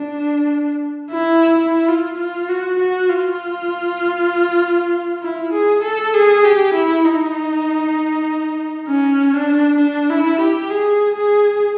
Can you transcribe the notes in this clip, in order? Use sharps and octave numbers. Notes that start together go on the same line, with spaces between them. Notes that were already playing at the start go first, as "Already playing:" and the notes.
Already playing: D4
E4
E4
F4
F4
F#4
F#4
F4
E4
G#4
A4
G#4
G4
E4
D#4
C#4
D4
D4
E4
G4
G#4
G#4